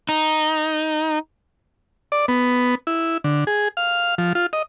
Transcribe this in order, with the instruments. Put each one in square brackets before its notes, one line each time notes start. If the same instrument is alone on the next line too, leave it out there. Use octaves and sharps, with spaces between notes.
[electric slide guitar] D#4
[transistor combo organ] D5
B3
E4
D3
G#4
F5
F3
F4
D#5